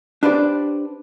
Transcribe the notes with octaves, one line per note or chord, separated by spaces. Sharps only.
D4 G4 B4 C5 D5